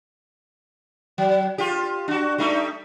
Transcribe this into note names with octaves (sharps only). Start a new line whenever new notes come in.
F#3
F4 G4
D4 F#4
G3 A3 D#4